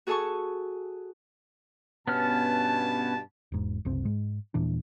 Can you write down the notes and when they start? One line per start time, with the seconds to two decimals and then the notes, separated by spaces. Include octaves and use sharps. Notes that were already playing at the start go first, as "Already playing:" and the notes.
0.07 F#4 G#4 A4 G#5 A5 C#6
2.08 G2 B2 B3 C#4 A5 F6
3.52 E1 G#2
3.85 F#1 C2 C4
4.05 G#2 G#3
4.54 D#1 A#2 E3 D4